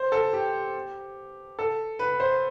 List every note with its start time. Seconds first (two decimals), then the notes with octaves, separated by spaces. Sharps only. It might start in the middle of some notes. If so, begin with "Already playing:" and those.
Already playing: C5
0.12 A4
0.33 G4
1.59 A4
1.99 B4
2.20 C5